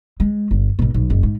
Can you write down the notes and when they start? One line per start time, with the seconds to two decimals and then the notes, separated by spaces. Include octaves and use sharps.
0.20 G#3
0.51 G1
0.79 G#1 B2
0.94 B1
1.10 F#1
1.23 G#2